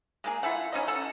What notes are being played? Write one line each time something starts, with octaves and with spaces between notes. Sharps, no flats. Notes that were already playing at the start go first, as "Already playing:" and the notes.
G#3 A#3 G#4
E4 F4 A4 F#5
E3 C#4 D#4 D#5
A4 F#5